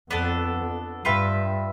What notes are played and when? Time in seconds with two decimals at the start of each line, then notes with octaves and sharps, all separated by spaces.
0.10 F2 B3 D4 A4
1.05 G2 F4 B4 E5 G5